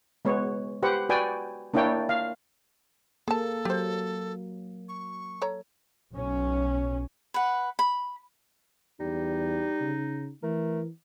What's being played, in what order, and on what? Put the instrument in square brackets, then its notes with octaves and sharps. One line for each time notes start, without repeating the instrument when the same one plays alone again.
[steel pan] G#3 B3 C#5
G4 B4 C5 F#5
F#4 B4 D5 G5 G#5
A#3 D4 E4 C#5 G5
F5
[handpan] A#3 [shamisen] G#4 A5 [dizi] A4
[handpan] F#3 [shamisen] G4 C5
[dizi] C#6
[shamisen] A4 C#5 A#5
[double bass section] B1 C#4
[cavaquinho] B4 F#5
B5
[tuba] E2 [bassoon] G3 [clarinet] D#4
[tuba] C#3
[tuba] E3 [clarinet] A3 [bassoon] A#4